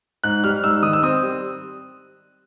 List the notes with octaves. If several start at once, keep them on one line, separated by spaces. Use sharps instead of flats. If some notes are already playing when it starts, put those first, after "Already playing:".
G#2 F#6
G3 F6
G#2 E6
D#3 D#6
E6
C4 D#6
G3